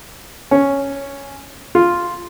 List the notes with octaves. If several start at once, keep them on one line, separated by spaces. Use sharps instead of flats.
C#4
F4